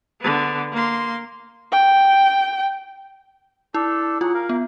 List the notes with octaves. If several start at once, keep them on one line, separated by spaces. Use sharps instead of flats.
D3 B3
A#3 C6
G5
D4 E4 A4
F#3 F4 G#4 F#5
A#4 F5
B3